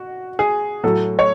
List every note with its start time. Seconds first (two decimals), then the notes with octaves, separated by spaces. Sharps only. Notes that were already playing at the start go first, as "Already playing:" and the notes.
Already playing: F#4
0.39 G#4
0.84 A2 F#3 A3 A4
1.19 C#5